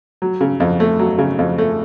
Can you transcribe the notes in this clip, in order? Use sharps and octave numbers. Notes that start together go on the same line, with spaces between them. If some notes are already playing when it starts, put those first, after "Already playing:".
F#3
C#3
F2
A3
F#3
C#3
F2
A3